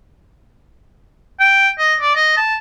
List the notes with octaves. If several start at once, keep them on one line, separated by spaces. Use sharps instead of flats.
G5
D#5
D5
D#5
A5